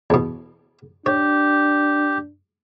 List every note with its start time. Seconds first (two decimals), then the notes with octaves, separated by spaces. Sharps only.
0.10 E2 B2
1.06 D4 G4 C#5